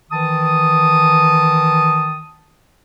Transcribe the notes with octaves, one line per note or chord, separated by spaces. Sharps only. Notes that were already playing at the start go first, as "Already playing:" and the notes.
D#3 E3 A5 D#6